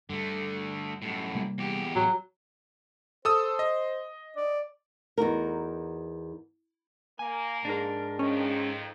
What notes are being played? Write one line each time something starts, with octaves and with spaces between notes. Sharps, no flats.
G2 D3 A3
F#2 A2
C3 G3 A#3
E2 G4
A2 F#3
A4 C5 D#6 E6
D#5
D5
E2 D#4 F#4 A#4
A#3 G#5
G#2 D4 A#4
F2 D#3 C#4